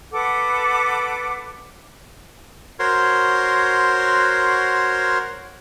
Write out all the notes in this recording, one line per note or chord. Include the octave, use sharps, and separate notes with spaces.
A4 B4 F#5 D6
F#4 A#4 C5 C#5 C6